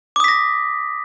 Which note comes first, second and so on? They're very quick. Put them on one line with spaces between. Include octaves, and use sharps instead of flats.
D6 D#6 B6 A#6